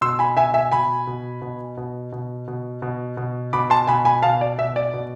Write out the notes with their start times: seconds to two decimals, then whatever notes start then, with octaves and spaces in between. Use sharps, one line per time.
0.01 B2 C6 E6
0.19 G#5 B5
0.37 B2 E5 G#5
0.54 E5 G#5
0.72 B2 G#5 B5
1.07 B2
1.42 B2
1.77 B2
2.12 B2
2.48 B2
2.82 B2
3.17 B2
3.53 B2 B5 D6
3.70 A5 C6
3.87 B2 G#5 B5
4.05 G#5 B5
4.22 B2 F5 A5
4.41 D5
4.58 B2 E5
4.76 D5
4.94 B2